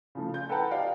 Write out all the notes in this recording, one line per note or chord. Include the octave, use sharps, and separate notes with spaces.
C#3 F3 A3
G6
A4 B4 F#5 G5 A5 A#5
G4 D5 D#5 F5 G5